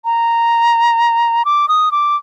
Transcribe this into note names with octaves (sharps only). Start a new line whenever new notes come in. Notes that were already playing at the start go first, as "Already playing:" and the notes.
A#5
D6
D#6
D6